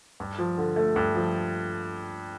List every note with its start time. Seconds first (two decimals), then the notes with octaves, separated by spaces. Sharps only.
0.20 G2
0.39 F3
0.58 D3
0.76 A3
0.96 G2
1.15 F3